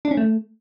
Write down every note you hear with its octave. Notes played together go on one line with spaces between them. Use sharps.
D4
C#4
A3